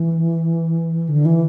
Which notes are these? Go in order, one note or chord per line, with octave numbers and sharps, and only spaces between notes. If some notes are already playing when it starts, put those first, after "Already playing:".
Already playing: E3
D3
E3